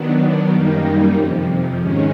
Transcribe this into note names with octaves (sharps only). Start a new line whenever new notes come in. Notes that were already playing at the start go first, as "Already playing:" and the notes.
Already playing: D#3 F#3 B3 D4
F#2 D#3 G3 A#3 D#4
F2 C3 F3
G#2 D#3 G#3 C#4